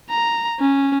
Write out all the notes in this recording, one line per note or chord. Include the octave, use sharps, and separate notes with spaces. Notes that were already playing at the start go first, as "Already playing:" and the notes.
A#5
C#4